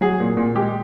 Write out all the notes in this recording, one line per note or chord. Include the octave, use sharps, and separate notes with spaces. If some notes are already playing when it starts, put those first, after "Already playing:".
F#3 G#4
A#2
A#2
G#3 G4